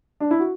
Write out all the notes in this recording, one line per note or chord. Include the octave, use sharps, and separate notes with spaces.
D4
E4
F#4